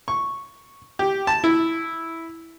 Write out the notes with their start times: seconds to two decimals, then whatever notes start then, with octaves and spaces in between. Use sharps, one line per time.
0.08 C#6
0.99 G4
1.27 A5
1.44 E4